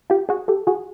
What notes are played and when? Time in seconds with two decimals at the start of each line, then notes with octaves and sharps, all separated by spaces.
0.10 F4 G4
0.29 F#4 G#4
0.48 G4 A4
0.67 F#4 G#4